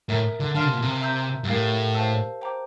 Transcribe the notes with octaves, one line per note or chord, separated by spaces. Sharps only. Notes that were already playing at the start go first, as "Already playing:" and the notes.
A2 A#4 E5 A#5
D3
D3 F5 A5 C6 F6
C3
A#2
C3
E5 A#5 E6 G6
G2
A2 G4 A#4 F5
C5 F5 A5 E6
C5 G5 A#5 D6